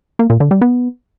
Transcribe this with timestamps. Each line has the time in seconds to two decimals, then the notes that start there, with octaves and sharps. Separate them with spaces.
0.19 A#3
0.30 A#2
0.40 D3
0.51 G3
0.61 B3